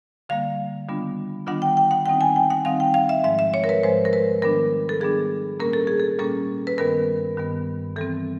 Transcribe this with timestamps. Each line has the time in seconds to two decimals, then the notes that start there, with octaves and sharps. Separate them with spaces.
0.29 D3 G3 A#3 F5
0.88 D#3 G3 B3 D4 F4
1.47 D#3 G3 B3 D4 F4 F#5
1.62 G5
1.77 G5
1.91 F#5
2.06 D#3 G3 C4 D#4 G5
2.21 G#5
2.36 G5
2.50 F#5
2.65 D#3 G3 C4 D#4 F5
2.80 G5
2.94 F5
3.09 E5
3.24 G#2 F3 G#3 E5
3.39 E5
3.54 C#5
3.64 A#4
3.69 B4
3.83 G#2 F3 G#3 C5
4.05 A#4
4.13 B4
4.42 D#3 G3 B3 D4 A#4
4.89 A4
5.01 D#3 G3 B3 D4 G#4
5.60 A#2 G3 A#3 C#4 A#4
5.73 A4
5.87 G#4
6.00 A4
6.19 A#2 G3 A#3 C#4 A4
6.67 B4
6.78 G2 D#3 G3 B3 A#4
7.37 G2 D#3 G3 B3
7.96 E3 G3 C4 A4